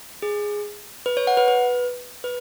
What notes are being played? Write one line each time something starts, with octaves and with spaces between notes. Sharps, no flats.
G#4
B4
C#5
F#5
B4
B4
B4